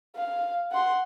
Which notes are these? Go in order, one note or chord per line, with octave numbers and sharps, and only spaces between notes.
F5
F#5 C6